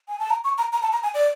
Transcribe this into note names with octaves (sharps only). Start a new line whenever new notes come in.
G#5
A5
A#5
C#6
A#5
A#5
A5
A#5
G#5
D5